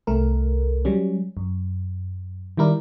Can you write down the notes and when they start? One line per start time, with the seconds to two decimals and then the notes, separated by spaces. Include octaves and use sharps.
0.07 C2 A3 A#4
0.85 F#3 G3 C#4
1.37 F#2
2.57 D#3 G3 E4 A#4 D5